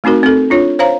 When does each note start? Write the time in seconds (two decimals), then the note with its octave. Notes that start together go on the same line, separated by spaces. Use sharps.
0.04 A3 C4 D#4 F#4 A#4
0.23 C4 A4
0.50 D4 F4 C#5
0.79 C5 C#5 F5 A#5